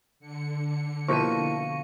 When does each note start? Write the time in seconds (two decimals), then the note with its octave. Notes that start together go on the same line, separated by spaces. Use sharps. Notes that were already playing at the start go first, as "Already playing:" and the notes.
0.20 D3 C#7
1.08 B2 F3 A#3 E4 A4 C#6 A#6 D#7